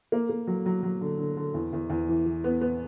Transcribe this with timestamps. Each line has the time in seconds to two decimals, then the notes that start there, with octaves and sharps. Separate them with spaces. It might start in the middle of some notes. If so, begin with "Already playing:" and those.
0.12 A#3
0.30 A#3
0.47 F#3
0.66 F#3
0.83 F#3
1.01 D3
1.19 D3
1.37 D3
1.54 E2
1.73 E2
1.90 E2
2.09 E3
2.26 E3
2.44 B3
2.61 B3